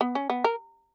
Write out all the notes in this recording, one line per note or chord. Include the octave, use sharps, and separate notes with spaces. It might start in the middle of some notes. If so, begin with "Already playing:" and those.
B3
C#4
B3
A#4